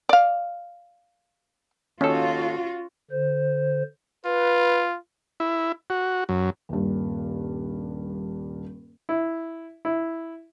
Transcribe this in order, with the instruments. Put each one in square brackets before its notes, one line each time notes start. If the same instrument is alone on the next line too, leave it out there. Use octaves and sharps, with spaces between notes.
[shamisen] D5 F5
[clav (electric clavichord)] D#2 A4 [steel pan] C#4 [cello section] F4 F#4
[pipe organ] D3 C5
[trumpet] F4 [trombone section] B4
[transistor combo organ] E4
F#4
F#2
[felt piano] D#1 G2
[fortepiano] E4
E4